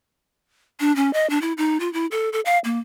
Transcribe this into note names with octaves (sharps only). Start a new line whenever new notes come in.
D4
C#4
D#5
D4
E4
D#4
F4
E4
A4
A4
F5
A#3